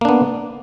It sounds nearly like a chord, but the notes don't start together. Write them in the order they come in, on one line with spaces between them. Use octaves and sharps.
A#3 D4 B3